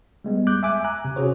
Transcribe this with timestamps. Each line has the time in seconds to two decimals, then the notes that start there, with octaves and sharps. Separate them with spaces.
0.24 G3 G#3 B3
0.47 D6 F#6 G6
0.63 E5 G#5 D6
0.84 G#5 A#5 F#6
1.05 C3
1.16 C#4 F#4 G#4 C5 C#5